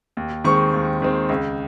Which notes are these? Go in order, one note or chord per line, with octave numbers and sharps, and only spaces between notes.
D#2
D#3 G#3 C4 C#6
D#2
D#3 G#3 C4
C#2